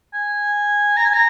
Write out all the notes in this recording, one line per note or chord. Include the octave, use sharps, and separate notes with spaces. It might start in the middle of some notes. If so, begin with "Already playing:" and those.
G#5
A#5
G#5
A#5